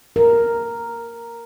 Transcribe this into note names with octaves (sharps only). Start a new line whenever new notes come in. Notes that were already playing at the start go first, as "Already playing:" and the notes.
A#4